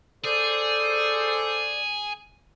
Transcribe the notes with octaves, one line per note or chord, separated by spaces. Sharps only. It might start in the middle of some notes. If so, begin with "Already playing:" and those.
G#4 A4 C5 D5